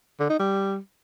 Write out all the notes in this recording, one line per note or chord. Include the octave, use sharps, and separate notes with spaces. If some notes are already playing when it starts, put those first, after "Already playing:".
D3
D#4
G3